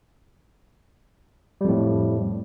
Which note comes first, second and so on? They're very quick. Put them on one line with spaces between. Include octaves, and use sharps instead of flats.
G3 F2 A2